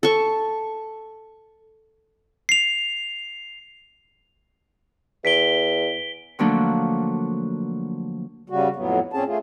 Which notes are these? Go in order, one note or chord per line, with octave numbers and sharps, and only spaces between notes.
A4 C#6
C7 F7
E2 B6 D7 G7
D3 F3 F#3 A3 A#3 D4
C#3 G3 F#4
F2 A2 F#3 B3
A#2 C4 C#4 G#4 A5
A3 F4 G#4